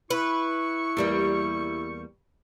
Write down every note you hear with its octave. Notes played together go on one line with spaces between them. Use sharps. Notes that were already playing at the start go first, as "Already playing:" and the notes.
E4 B4 C#6
E2 G3 A#3